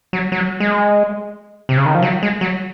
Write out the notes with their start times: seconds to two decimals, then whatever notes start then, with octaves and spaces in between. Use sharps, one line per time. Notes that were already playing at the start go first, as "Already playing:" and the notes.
0.13 F#3
0.32 F#3
0.60 G#3
1.69 C3
1.77 C#3
1.86 D#3
1.95 F3
2.03 F#3
2.23 G#3
2.41 F#3